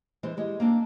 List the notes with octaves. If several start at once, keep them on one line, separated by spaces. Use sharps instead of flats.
E3 G#3 C5
G3 G#3
A#3 C4 D4